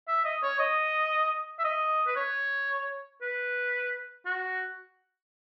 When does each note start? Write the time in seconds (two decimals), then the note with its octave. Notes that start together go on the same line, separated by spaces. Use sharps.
0.08 E5
0.25 D#5
0.43 C#5
0.59 D#5
1.59 E5
1.64 D#5
2.07 B4
2.16 C#5
3.22 B4
4.26 F#4